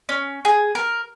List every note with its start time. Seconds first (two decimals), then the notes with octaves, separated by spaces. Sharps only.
0.09 C#4
0.45 G#4
0.75 A#4